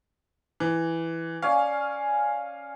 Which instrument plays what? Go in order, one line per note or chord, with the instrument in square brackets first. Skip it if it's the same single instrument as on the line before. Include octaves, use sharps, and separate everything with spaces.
[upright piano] E3
[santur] C#4 D5 G#5 [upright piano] F5